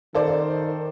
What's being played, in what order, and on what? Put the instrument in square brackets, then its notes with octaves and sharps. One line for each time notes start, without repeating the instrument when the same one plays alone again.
[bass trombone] D#3 [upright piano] A4 C5 D5